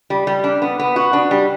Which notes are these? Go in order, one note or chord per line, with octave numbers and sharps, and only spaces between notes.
G3
G3
D4
B3
B3
F#4
D4
G3